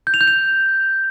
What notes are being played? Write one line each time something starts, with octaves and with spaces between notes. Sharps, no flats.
G6
F7
G6
F7